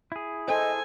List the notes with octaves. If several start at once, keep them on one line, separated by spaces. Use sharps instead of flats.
E4 G#4
A4 C5 D#5 G#5